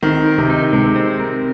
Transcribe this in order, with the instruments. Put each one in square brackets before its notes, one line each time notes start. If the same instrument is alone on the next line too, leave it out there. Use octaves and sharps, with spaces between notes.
[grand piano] D#3 [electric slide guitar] C4
[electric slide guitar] A#4
[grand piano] C3
[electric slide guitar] D#4
[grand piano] C3 [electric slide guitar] G#3
[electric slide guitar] C4
A#4